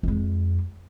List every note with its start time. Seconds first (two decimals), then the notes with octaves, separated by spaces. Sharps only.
0.03 F2 G#3